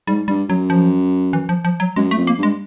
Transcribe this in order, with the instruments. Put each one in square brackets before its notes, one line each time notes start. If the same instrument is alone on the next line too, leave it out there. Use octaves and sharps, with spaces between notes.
[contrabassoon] G#2 [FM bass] G3
[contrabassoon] G2 [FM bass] G3
[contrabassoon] F#2 [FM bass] F#3
[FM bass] F3
E3
F3
F3
F#3
[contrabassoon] F#2 [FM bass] G#3
[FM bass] A3
[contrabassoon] F2
[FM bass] A#3
[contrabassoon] G2 [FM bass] G#3